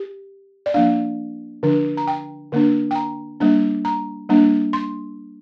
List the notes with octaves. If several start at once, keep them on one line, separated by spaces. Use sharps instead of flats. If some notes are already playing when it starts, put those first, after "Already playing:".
Already playing: G4
D5
F3 A#3 D4 F5
D3 F3 D4
A#5
G5
D3 A#3 D4
G5
A#5
G3 A#3 D4
A#5
G3 A#3 D4
C6